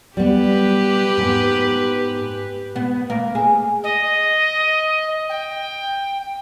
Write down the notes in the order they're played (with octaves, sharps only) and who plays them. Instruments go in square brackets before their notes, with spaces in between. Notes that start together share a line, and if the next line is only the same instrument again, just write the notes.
[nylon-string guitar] G3 B3 [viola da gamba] G4 B4
[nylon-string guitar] G#2 B3
[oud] B3
A#3
G#4
[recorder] D#5
G5